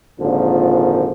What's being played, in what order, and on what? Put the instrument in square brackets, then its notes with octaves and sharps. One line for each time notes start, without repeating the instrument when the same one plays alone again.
[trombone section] G#1 A#2 D3 F3